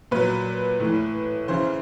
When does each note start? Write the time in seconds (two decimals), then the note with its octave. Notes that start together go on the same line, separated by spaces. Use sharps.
0.11 A#2 F#3 B4
0.80 A2 E3
1.48 C#3 E3 C5